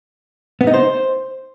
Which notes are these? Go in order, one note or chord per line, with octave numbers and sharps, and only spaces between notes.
B3
D#4
C5